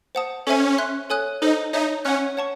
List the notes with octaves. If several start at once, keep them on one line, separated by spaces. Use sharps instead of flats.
C5 F#5 A5 D#6
C#4 A4 C5 E5 G#5
E5 C6 F#6
A4 C#5 G#5 D#6 F#6
D#4 A4 C5 D#5
D#4 C#5 E5 A5
C#4 C#5 F#5 C#6 F#6
C#5 F#5 A5 C#6